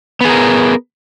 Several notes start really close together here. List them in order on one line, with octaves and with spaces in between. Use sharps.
B3 G#4 A#4